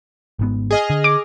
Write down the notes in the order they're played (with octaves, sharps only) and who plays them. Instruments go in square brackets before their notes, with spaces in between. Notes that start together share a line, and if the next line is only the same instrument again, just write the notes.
[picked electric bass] G#1 G#2 B3
[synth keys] G#4 D#5 F6
[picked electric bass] D3
[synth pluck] D6